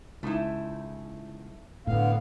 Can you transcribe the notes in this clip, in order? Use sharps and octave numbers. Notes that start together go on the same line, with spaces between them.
C#2 A3 D#4 E4
A2 D3 B3 F5